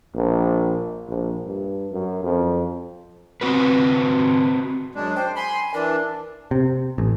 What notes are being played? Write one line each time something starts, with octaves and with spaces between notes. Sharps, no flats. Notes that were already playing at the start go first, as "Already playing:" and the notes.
A#1
A#1
G2
F#2
F2
C4 F#4 B4
F#2 G#3 D4
C5 G5
G#5 B5 C6
E3 D4 A#4
C3
A1